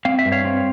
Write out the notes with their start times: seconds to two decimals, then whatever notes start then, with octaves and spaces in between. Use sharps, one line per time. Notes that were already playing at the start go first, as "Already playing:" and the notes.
0.05 C4 F5
0.19 E5
0.25 G2
0.32 C#5 F5
0.45 C4